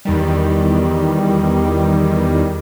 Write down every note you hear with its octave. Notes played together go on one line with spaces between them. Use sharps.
E2 D#3 G3